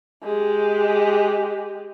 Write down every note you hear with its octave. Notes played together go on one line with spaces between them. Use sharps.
G#3 G4